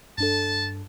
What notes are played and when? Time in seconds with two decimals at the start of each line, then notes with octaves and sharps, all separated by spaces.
0.18 G2 D4 A4 A5